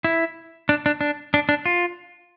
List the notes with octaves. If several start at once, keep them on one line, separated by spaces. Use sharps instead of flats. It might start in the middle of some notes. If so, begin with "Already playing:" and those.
E4
D4
D4
D4
D4
D4
F4